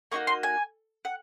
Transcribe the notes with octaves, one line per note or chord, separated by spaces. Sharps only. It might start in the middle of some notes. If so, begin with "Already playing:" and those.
A#3 D#4 F#4 C#6
C6
G#5
F#5